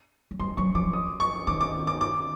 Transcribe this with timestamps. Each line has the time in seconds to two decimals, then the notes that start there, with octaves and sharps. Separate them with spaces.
0.31 F#3
0.39 G3 C6
0.57 F#3 C#6
0.75 F3 D6
0.93 D#6
1.20 C#6
1.47 D#3 D6
1.61 D6
1.87 D6
2.01 D6